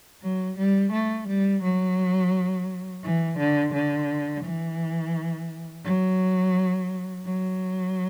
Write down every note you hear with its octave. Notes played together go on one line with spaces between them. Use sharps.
F#3
G3
A3
G3
F#3
E3
D3
D3
E3
F#3
F#3